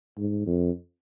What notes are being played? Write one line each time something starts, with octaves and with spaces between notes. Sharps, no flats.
G#2
F2